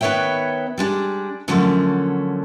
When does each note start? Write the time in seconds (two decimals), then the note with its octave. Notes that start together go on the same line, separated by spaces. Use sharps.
0.01 D#3 B3 B4 C#5 E5 G5
0.78 G3 G#3 D4
1.48 D3 F3 F#3 A3 A#3 C#4